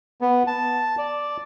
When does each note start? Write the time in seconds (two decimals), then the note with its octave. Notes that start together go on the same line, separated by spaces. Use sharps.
0.21 B3
0.47 A5
0.98 D5